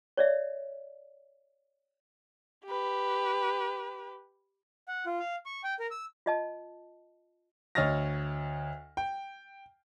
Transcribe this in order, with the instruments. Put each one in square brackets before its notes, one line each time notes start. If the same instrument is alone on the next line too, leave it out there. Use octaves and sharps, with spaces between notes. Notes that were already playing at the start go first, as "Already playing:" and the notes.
[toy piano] C#5 D5 E5
[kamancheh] G4 B4
[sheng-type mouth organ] F#5
F4
F5
C#6
G5
A#4
E6
[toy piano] F4 D#5 A5
[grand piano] D2 C#5 D#5 F6 A6 A#6
G5